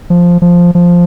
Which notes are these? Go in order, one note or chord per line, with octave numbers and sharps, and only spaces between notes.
F3
F3
F3